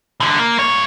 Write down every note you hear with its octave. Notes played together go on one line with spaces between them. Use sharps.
C2 D3
A#3
G2 C#5